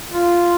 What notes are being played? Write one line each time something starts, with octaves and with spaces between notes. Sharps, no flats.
F4